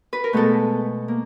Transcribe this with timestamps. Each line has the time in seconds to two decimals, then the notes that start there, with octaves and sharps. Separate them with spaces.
0.13 B4
0.24 A#4
0.33 B2 G#3 A3 B3 A4
1.08 A#3